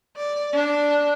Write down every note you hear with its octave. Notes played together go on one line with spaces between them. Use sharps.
D5
D4